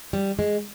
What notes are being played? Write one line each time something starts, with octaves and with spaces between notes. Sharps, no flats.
G3
G#3